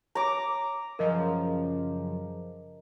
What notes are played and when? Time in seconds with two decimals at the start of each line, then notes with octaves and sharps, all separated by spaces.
0.15 C#5 A#5 D6 D7
0.99 F#2 C#3 F3 A#4 D#5